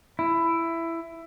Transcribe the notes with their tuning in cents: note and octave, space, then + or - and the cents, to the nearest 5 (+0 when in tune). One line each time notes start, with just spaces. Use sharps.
E4 +10